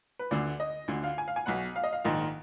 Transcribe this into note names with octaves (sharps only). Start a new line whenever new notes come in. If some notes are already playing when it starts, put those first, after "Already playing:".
B4
D2 D3 D5
D#5
D2 D3
F5
G#5
F5
G#5
B1 B2 F#5
F5
D#5
F5
A#1 G#2 D#3